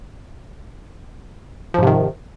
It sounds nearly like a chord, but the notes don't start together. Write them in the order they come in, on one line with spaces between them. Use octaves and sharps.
F3 G#2 C3 D#3